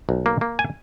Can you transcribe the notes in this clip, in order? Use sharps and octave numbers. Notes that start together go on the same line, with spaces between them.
B1
A#3
A#3
G#5